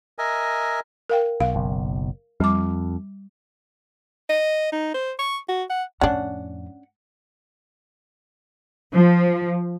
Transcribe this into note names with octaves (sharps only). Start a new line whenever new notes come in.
A#4 D#5 E5 G#5
A#4 F5 G5
B1 F5
F#1 B1
F2 G3 D6
D#5
D#4
C5
C#6
F#4
F#5
F2 A2 C#4 D4 F#5
F3